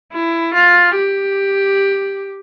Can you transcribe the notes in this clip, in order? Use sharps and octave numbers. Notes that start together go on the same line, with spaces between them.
E4
F4
G4